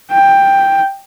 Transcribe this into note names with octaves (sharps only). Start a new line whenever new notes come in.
G5